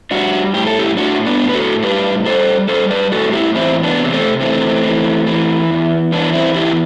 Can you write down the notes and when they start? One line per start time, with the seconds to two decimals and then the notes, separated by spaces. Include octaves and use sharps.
0.11 G3 D4 F#4
0.54 A2 G4
0.67 A4
0.79 E4 G4
0.97 A2 D4 F#4
1.26 B3 D4
1.41 A2
1.49 B4
1.54 F#4 A4
1.83 G3 G4 B4
2.26 G3 A4 C5
2.69 G3 A4 C5
2.91 B4 D5
3.12 A2 F#4 A4
3.33 E4 G4
3.55 E2 C4 E4
3.83 B3 D4
3.98 C3
4.13 A3 C4
4.41 E3 A3 C4
4.85 E3
5.27 E3
5.71 E2
6.12 E3 B3 D4
6.34 C4 E4
6.56 E2 E4 G4